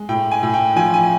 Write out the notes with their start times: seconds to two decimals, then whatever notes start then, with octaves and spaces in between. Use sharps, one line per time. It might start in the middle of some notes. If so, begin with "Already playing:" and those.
Already playing: G#3
0.09 A2 G5
0.31 G#5
0.43 A2
0.54 G5
0.76 F3 G#5
0.94 G#5